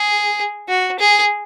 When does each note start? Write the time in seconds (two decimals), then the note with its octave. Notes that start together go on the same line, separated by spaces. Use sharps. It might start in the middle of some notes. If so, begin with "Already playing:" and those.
Already playing: G#4
0.69 F#4
0.99 G#4